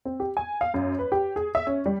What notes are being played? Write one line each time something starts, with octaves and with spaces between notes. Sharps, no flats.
C4
G4
G#5
F5
F#2
B4
G4
G#4
E5
C#4
G3